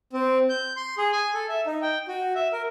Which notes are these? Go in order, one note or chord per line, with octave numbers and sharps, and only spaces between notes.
C4
G6
C6
G#4
G#5
A4
E5
D#4
G5
F#4
E5
A#4